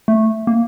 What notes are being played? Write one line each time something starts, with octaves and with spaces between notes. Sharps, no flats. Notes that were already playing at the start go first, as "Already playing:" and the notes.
A3
A#3